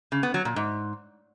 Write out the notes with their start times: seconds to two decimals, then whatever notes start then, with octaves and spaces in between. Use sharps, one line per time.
0.12 C#3
0.23 B3
0.34 F#3
0.45 A#2
0.56 G#2